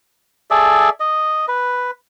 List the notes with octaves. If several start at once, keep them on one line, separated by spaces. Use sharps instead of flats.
G#4 A4 D5 E5
D#5
B4